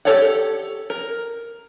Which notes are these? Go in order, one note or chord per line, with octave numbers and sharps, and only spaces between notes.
G4 A4 C#5 D5 F#5
A#4